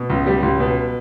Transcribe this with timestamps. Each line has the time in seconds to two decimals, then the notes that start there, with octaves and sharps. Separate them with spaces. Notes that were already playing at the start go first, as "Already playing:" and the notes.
Already playing: B2
0.10 C#2
0.27 G3
0.43 C#2
0.60 B2